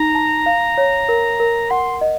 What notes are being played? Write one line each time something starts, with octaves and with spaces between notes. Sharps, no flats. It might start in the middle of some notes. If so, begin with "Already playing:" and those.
Already playing: D#4 A#5
A5
F5
C#5
A#4
A#4
F#5 C6
D#5